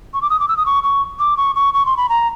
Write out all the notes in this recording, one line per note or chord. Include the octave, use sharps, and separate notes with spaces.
C#6
D6
D#6
D6
E6
D#6
C#6
C#6
D6
C#6
C#6
C#6
C6
B5
A#5